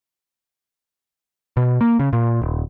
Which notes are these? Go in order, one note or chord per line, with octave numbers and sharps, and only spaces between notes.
B2
A#3
C#3
A#2
D#1